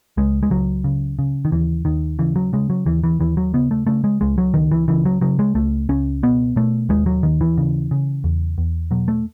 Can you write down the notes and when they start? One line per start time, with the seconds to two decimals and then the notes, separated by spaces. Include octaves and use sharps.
0.17 C#2 G#3
0.43 G#3
0.50 C#2 F#3
0.84 C#3
1.19 C#3
1.45 D#3
1.52 D#2 E3
1.85 D#2 D#3
2.19 C#3 E3
2.36 F#3
2.53 C#3 G#3
2.70 F#3
2.86 D#2 E3
3.04 E3
3.20 D#2 E3
3.37 F#3
3.54 C#3 B3
3.71 A3
3.87 C#3 A3
4.04 G#3
4.21 C#2 G#3
4.38 F#3
4.54 C#2 D#3
4.71 E3
4.88 C#3 E3
5.05 F#3
5.21 C#3 F#3
5.39 G#3
5.55 C#2 A3
5.89 C#2 C#4
6.23 B2 B3
6.56 B2 A3
6.89 D#2 G#3
7.06 F#3
7.23 D#2 D#3
7.41 E3
7.58 C#3
7.91 C#3
8.24 E2
8.58 E2
8.91 B2 F#3
9.08 A3